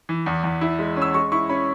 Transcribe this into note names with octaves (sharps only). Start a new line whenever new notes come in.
E3
E2
E2
E4
G#3
C#4
E6
G#3 C#6
E4 C#6
C#4 B5